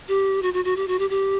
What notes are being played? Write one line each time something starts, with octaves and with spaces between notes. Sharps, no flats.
G4
F#4
F#4
F#4
G4
F#4
G4
G4